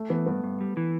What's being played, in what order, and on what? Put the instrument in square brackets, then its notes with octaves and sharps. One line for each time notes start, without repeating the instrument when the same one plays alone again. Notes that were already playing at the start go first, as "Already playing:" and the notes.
Already playing: [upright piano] A3
[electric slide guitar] E3 [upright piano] B3
[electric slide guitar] G2 [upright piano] B3
[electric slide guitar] G2
G3
E3